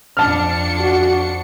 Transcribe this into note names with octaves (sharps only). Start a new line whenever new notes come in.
F2 D4 A5 F6 C#7
F#4